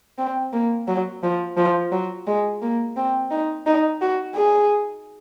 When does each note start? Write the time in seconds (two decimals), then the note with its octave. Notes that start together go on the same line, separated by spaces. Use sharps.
0.18 C4
0.53 A#3
0.88 F#3
1.23 F3
1.57 F3
1.91 F#3
2.27 G#3
2.62 A#3
2.96 C4
3.31 D#4
3.66 D#4
4.01 F#4
4.35 G#4